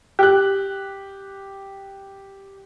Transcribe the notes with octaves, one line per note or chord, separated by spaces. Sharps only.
G4 F#6